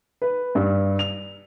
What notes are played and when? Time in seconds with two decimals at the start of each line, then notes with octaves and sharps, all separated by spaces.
0.22 B4
0.55 G2
0.99 F7